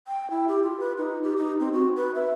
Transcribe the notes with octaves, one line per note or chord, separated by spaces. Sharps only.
G5
E4
G4
F4
B4
D#4
G4
D#4
C4
F#4
B4
E5